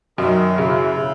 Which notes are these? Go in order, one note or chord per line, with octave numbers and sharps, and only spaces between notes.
F#2 D#3
C#3 E3
C#3